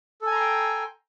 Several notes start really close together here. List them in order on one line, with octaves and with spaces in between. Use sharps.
A4 G#5 A#5 C6 G5